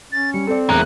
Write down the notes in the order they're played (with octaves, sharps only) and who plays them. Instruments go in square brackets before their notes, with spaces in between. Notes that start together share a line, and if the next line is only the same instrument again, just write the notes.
[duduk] C#4 [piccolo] A6
[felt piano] G3 [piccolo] C#7
[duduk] C4 [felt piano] A4 D5
[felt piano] E1 A#3 [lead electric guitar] E4 A#4 [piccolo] F#6